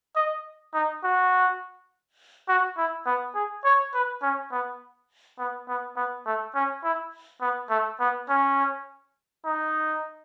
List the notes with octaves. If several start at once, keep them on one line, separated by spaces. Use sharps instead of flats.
D#5
D#4
F#4
F#4
E4
B3
G#4
C#5
B4
C#4
B3
B3
B3
B3
A3
C#4
E4
B3
A3
B3
C#4
D#4